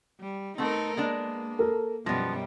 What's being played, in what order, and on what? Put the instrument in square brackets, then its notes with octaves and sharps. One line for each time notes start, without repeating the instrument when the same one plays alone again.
[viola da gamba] G3
[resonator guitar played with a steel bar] A3 B3 C4 [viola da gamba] D#4 A4 A#4
[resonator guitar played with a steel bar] G#3 B3 D4 [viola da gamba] A#3
[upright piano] A4 A#4
[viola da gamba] F#2 B2 G3 [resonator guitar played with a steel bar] F3 B3 [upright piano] A#6